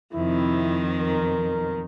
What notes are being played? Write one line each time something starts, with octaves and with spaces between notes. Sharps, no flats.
F2 C3 D#3 E4
B1 D#4 A#4